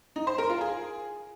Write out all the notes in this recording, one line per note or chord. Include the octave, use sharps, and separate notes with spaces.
D#4
C5
A#4
F4
G#4